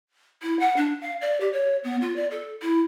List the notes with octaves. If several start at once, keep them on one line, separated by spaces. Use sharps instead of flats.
E4
F#5
D4
F5
D5
G4
C#5
B3
F4
D5
A4
E4